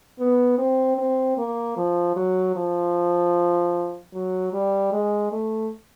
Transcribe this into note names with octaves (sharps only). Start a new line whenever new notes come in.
B3
C4
C4
A#3
F3
F#3
F3
F#3
G3
G#3
A3